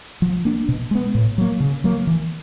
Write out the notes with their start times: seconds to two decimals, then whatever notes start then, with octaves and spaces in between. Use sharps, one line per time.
0.22 F3
0.45 A#3 D4
0.69 B2
0.91 G#3 B3
1.15 A2
1.38 F#3 A#3
1.60 C#3
1.84 F#3 A#3
2.07 E3